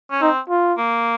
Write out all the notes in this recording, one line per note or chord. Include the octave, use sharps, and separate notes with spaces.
C#4
C4 D#4
F4
A#3